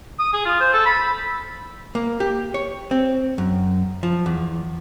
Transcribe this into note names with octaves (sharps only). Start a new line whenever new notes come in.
D#6
G#4
F4
C5
A4
B5
A#3
G4
C#5
C4
F#2
F3
E2